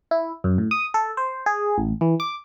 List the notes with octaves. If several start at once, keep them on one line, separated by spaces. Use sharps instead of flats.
E4
F#2
A2
D#6
A4
C5
G#4
A1
E3
D6